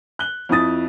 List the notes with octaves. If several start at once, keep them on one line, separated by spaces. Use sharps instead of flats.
F#6 G7
F2 F3 E4 D#6 A6